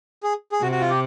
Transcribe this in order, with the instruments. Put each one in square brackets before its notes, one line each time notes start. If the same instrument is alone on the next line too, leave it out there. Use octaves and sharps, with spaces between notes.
[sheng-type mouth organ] G#4
G#4
[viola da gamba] C3 [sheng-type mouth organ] F#4
[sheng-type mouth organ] F#4
F4
G4